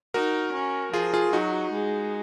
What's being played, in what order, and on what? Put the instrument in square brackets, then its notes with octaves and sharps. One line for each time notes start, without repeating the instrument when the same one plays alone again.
[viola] D#4 [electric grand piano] F#4 A#4
[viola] C#4
[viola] F3 [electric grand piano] F4 G#4
[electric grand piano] F4 G#4
[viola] F#3 [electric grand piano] D#4 F#4
[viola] G#3